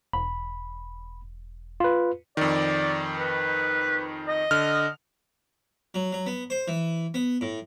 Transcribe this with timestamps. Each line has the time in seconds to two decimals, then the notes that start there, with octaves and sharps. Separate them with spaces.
0.13 E1 B5
1.80 F4 B4
2.37 F2 D#3 D5
3.18 B4
4.28 D#5
4.51 D3 F6
5.94 F#3
6.12 F#3
6.26 B3
6.50 C5
6.68 E3
7.14 B3
7.41 A2